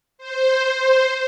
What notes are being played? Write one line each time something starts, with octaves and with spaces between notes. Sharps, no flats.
C5
C5